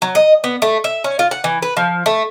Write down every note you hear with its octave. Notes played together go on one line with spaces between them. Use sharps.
F#3
D#5
B3
A3
E5
C#4
F4
F#5
E3
B4
F3
A3